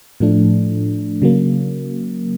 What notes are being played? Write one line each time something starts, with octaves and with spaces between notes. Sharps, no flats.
A2 F3 A3 D4
C#3 F#3 A#3